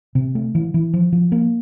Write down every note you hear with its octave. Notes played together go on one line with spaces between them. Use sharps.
C3
A3
E3
E3
F3
F3
A#3